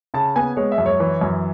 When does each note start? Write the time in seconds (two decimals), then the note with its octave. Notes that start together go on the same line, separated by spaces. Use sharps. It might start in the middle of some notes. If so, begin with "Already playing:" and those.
0.14 C#3 A5
0.35 B3 G#5
0.57 G#3 C#5
0.72 E5
0.78 F#2
0.86 C#5
1.00 E3
1.21 F#2